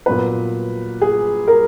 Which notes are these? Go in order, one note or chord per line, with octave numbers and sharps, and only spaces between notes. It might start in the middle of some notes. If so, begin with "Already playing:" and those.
A#2 F#3 B3 B4
G#4
A#4